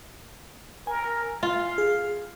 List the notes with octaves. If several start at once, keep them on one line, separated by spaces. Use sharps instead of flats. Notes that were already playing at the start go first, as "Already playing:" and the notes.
A#4 G#5
F4 F5
G#4